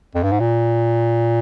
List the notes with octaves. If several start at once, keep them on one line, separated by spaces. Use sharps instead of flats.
F2
G2
G#2
A#2